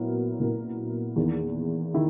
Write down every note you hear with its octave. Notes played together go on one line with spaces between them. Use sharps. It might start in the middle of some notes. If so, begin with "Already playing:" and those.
Already playing: A#2 F#3 B3 E4 A#4
A#2 F#3 B3 E4 A#4
E2 D#3 A#3 E4
D#3 E4